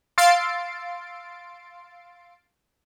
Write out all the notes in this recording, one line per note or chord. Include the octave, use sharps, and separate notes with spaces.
F5 C6 E6 A6 C7 D7